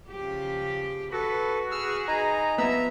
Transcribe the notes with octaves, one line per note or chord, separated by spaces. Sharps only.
C#3 F3 G4
F#4 A4 B4
G#4 B4 E6 F6
D#4 G#5 A#5
F3 B3 E5 A#5 E6